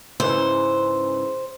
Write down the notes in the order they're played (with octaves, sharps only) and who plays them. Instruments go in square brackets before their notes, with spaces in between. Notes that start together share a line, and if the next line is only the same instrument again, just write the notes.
[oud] G#2 C#3 E3 [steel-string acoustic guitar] C5